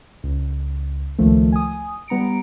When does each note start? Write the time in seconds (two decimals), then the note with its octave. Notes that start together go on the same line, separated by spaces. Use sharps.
0.24 C#2
1.19 C#2 D#3 F3 A3
1.52 G#5 D#6
2.08 G3 B3 A#5 C#7 D7